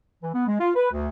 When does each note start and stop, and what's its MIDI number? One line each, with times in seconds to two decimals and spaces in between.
0.22 0.30 52
0.34 0.44 59
0.47 0.56 56
0.60 0.71 65
0.76 0.90 71
0.92 1.09 38